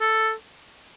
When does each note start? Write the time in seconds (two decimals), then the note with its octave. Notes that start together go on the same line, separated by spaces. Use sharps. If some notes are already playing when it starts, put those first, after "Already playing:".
0.01 A4